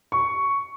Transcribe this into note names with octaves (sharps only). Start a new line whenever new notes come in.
C#6